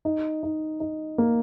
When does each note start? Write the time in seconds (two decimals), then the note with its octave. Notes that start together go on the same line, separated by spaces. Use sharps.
0.05 D#4
0.43 D#4
0.80 D#4
1.18 A#3